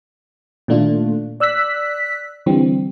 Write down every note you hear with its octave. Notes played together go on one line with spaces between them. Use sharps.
A#2 D#3 A3 D4 F4
D5 E6 F#6 B6
D3 E3 G3 C4